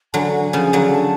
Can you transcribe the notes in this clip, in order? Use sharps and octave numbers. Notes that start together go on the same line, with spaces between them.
D3 F#3 G#5 A5
C#3 F3
D3 F#3
A5